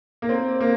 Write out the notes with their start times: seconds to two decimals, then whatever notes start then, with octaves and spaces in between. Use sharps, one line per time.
0.22 A#3
0.29 C4
0.61 A#3